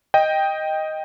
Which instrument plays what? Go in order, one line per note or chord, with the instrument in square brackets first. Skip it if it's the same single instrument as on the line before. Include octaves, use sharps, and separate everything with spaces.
[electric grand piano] D#5 G5